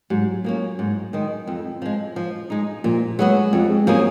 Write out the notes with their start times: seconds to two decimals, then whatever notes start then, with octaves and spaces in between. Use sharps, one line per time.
0.10 G#2 F#3
0.44 F3 A#3 C#4
0.79 G#2
1.13 D#3 G#3
1.47 F2
1.82 F3 G#3
2.16 F3
2.50 G#3 D#4
2.84 A#2 F3
3.19 F#3 G#3 B3 F#4
3.53 F2 F3
3.69 G#3
3.87 F3 F#3 A#3 C#4 G#4